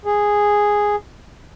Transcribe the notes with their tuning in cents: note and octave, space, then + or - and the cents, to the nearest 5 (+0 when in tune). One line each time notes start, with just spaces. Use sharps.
G#4 -5